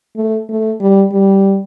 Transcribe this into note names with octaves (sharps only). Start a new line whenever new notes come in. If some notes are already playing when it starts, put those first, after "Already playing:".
A3
A3
G3
G3